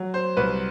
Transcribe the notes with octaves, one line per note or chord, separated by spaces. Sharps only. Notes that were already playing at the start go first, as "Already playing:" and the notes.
Already playing: F#3
C5
C2 B4